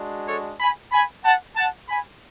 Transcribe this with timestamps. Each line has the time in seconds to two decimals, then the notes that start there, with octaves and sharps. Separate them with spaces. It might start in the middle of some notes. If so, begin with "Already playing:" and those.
Already playing: G#3 D4 F#4
0.27 A4 C#5
0.60 G#5 B5
0.92 G#5 B5
1.24 F#5 A5
1.56 F#5 A5
1.88 G#5 B5